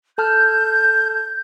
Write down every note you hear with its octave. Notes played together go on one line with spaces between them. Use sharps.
A4 A5 F6 G6